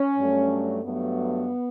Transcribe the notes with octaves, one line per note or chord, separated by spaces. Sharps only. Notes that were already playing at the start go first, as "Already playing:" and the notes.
Already playing: C#4
G2 F#3 A3
G2 F#3 A3 B3